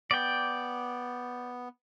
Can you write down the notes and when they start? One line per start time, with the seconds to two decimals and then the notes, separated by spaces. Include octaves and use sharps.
0.11 B3 D5 G5